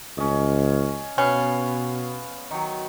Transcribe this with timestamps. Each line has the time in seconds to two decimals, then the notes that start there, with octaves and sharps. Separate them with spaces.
0.18 C#2 C#4 D#5
1.18 B2 B3 C#4 B4 F5
2.50 D#3 F#3